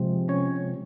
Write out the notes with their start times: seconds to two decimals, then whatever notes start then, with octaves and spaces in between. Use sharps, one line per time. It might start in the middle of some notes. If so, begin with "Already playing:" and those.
Already playing: C3 F3 G#3 C4
0.28 C#4 C#5